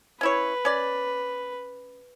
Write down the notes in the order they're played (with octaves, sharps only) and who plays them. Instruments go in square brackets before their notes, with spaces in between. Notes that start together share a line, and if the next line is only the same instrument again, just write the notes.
[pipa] C#4 E4 C#5 [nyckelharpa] B4
[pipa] C#4 D5